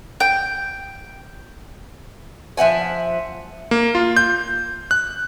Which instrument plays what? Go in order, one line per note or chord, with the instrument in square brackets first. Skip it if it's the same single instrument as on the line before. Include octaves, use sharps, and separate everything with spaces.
[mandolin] G5
[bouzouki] F3 E5 F#5 G#5
[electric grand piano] A#3
F4
G6
F#6